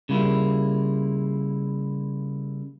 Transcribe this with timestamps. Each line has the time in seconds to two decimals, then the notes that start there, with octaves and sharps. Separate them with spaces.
0.09 C#3 G3 A#3 E4 F4